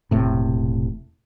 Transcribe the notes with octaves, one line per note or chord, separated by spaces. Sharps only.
E1 A2 C3